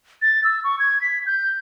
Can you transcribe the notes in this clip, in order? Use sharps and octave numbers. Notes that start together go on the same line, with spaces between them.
A6
E6
C#6
G#6
B6
G6